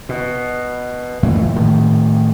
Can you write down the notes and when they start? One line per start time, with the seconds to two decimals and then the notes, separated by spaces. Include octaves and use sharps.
0.09 B2
1.23 F#2 A#2 E3 A3
1.56 A2 D#3